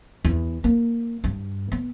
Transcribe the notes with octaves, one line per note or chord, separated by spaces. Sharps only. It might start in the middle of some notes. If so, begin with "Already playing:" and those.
E2
A#3
G2
B3